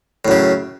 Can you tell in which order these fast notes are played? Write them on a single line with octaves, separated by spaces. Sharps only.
A2 F#2 C#3